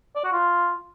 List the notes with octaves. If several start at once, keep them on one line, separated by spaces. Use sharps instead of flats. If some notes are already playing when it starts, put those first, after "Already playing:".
D5
F#4
F4